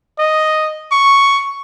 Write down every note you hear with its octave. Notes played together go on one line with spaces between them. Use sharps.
D#5
C#6